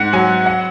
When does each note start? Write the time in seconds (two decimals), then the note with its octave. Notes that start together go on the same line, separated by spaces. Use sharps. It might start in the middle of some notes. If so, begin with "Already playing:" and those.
Already playing: G#2 F#5
0.13 F#3 G#5
0.46 F#5